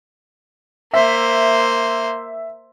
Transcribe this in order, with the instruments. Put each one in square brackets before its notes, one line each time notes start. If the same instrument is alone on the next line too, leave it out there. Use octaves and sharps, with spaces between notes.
[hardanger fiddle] A#3 C5 [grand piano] E5 B6